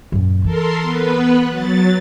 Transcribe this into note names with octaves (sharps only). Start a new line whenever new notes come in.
F#2 A#2
E3 A4 A#4 C6
B3 B4
F#3 A6